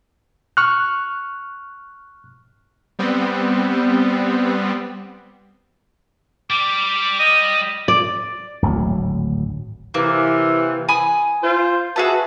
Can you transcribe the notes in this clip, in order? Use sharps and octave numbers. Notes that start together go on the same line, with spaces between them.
C#6 F6 F#6
G3 B3 C4
G3 D6
D#5 D#7
D5
D1 G#1 D2 F#3
C3 E3 A#3
G#5 B5 D#6
F4 C5
F#4 G#4 B4 E5 A5